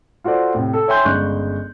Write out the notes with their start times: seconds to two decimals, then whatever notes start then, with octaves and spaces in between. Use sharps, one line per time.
0.24 F4 F#4 A4 C5 D5
0.55 A2 C3
0.73 A4
0.88 C#5 E5 G5 G#5 C6 G6
1.05 G1 C#3 G#3 C#6 F#6 G6